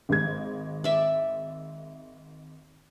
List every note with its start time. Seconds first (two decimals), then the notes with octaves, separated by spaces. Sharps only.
0.09 G#1 G#3 G#6
0.84 D5 E5